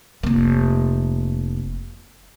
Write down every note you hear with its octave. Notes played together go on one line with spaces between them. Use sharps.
F1 A#3